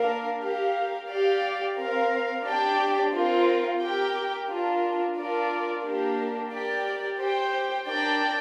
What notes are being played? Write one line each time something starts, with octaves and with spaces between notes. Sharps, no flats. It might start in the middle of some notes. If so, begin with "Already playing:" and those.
Already playing: A#3 D4 A#4 F5
G4 A#4 F5
G4 D5 F5
C4 A#4 F5
D4 G4 D5 G5
C4 F4 A#4
G4 A#4 G5
D4 F4 A#4
D4 F4 A#4 D5
A#3 D4 G4 A#4
G4 A#4 D5 G5
G4 C5 G5
D4 A#4 D5 G5